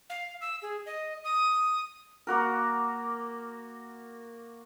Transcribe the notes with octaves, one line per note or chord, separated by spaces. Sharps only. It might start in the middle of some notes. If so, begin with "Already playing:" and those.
F5
E6
G#4
D#5
D#6
A#3 F#4 A#4